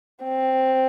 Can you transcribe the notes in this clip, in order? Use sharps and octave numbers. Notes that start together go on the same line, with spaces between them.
C4